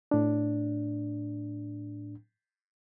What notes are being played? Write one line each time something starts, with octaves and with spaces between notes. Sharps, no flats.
A2 D4